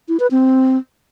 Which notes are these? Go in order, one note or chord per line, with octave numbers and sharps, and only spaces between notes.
E4
B4
C4